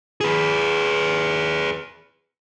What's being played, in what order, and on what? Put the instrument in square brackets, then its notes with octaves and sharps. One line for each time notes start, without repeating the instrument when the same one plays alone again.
[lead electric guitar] G#4 B4